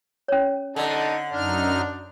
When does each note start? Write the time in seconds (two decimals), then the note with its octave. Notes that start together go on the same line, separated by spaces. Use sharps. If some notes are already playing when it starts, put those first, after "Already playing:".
0.28 C#4 C#5
0.76 D3 D4 D#4 A4
1.33 F#2 D4 D#4 F6